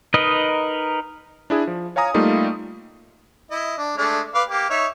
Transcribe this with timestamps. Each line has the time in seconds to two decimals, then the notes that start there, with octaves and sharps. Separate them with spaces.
0.14 D#4 A#4 B4 D#5
1.50 D4 E4 G#4
1.67 F3
1.96 C#5 F5 G#5 A#5 D#6
2.14 G3 A3 A#3 D#4 F4
3.51 E4 D#5
3.78 D4
3.98 G#3 A3 D4
4.35 B4 F5 D6
4.49 A#3 G4
4.70 D#4 C#5 E5